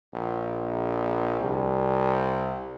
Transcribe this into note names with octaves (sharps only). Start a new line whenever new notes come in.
A#1
C2